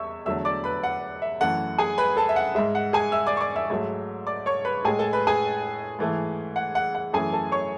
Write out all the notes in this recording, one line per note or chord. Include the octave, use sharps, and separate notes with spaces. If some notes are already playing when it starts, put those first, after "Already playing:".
Already playing: E2 E5 C#6 E6
E2 D3 F#3 A3 E5 E6
D5 D6
B4 B5
F#5
E5
F#2 E3 A3 F#5
G#4 G#5
B4 B5
A4 A5
E5
F#5
G#2 G#3 E5
F#5
G#4 G#5
E5 E6
D5 D6
C#6
D5 D6
E5 E6
G#2 F#3 A3
D5 D6
C#5 C#6
B4 B5
A2 G#3 G#4 G#5
A4 A5
B4 B5
G#4 G#5
G#2 E3 A3
F#5
F#5
F#5
F#2 E3 A3 G#4 G#5
A4 A5
C#5 C#6